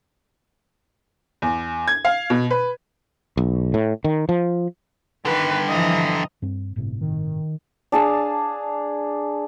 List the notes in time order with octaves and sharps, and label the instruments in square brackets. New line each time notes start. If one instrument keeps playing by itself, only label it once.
[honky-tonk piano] E2
G#6
F5
B2
B4
[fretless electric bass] B1
A2
D#3
F3
[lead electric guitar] G2 D3 [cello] D#3 [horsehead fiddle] B4
[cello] E3 F3 [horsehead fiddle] D#5 A#5
[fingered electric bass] G2 C4
G1 A2 C3
[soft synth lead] D#3
[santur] D4 G#4 F5 A5